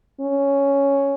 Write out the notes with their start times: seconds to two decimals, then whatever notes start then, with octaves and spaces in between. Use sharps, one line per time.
0.21 C#4